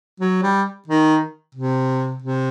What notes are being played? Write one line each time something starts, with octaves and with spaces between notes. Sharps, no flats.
F#3
G3
D#3
C3
C3